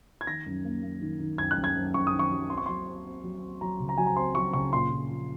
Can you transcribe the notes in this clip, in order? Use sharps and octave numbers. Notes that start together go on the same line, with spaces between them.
G#6
D#3 A#6
F#2
A#3
A#3
D#3
D#3
F#2 G#6
F#6
F#2
G#6
F#2
F#2 C#6
D#6
D#3
C#6
F#3
C4 C6
C#6
F#3 C6
C4
C4
F#3
C4
F#3 A#5
C#3
A#5
F#3 G#5
A#5
C4 C6
F#3 C#6
C#3 C#6
A#2 C6
A#2
F3